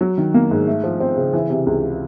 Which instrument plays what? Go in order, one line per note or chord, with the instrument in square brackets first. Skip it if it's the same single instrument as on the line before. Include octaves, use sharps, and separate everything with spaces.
[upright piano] F#3
D#3
A#3
G#2
A3
F3
C4
C#3
E3
C3
C#2